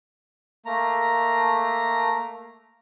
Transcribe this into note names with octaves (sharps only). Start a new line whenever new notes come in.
A3 A#3 A#5